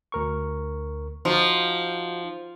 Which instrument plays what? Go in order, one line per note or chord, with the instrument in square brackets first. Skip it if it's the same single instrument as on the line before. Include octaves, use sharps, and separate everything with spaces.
[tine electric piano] D2 A#4 C#6
[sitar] F3 [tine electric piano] D#4 F#4 F#5